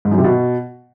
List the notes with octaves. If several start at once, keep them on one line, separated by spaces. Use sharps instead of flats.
G#2
F#2
C3
B2